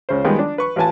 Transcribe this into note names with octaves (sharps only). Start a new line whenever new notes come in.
C#2 C#3 C5
D#3 F3 G3 G#3 B3 F4
D4
B4 C#6
A1 F4 B4 G#5 A5